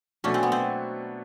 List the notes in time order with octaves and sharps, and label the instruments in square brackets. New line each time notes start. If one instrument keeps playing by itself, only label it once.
[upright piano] B2 F#3 A3 D4 F#4 [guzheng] C#4
[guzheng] C4
B3
C4